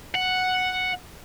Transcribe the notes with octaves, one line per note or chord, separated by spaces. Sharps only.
F#5